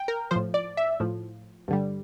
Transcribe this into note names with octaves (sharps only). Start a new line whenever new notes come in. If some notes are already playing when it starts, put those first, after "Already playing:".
Already playing: G5
A#4
A2 F3 C5
D5
E5
A2 F3
G2 D3 G3